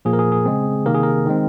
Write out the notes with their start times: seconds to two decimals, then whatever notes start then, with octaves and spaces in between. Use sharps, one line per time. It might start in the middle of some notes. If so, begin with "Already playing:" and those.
0.05 A#2 F3 A#3 G#4
0.13 A#4
0.19 G#4
0.32 G#4
0.45 C#3 G#3 C4
0.85 C3 D#3 A#3 A#4
0.94 G#4
1.03 A#4
1.26 D#3 G#3 C4